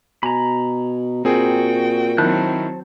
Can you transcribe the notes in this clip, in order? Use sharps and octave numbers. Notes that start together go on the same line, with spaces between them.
B2 G#5 A#5 B5
A#2 C4 F#4 G#4 G5
D#3 F#3 C4 E4 C5 A5 F#6